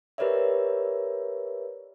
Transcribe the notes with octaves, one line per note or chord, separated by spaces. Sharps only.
G4 A#4 B4 C#5 D5 E5